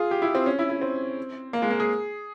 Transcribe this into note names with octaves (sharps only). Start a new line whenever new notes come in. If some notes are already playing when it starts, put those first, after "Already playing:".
Already playing: F4 G#4
G4
E4
C4
C#4
E4
E4
C4
A#3
G#3
A#3
G#4